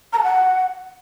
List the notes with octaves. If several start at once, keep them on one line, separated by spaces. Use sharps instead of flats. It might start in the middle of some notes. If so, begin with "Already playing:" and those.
A#5
A5
F#5